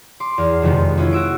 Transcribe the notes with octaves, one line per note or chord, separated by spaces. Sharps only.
C6 D6
E2 F6
F2 C3 D#3 G#3 B3
C#4 E4 F4
F#4 E6 D7